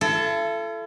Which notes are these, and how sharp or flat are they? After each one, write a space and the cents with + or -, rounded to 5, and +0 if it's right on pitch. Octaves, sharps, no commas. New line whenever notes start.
E4 +45 A4 +0